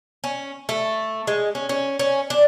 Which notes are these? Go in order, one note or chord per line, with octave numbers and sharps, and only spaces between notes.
C#4
A3
G#3
C#4
C#4
C#4
D4